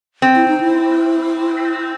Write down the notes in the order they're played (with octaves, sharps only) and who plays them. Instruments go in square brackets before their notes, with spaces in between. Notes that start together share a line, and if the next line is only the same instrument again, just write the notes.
[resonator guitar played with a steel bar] C4
[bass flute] E4
D#4
E4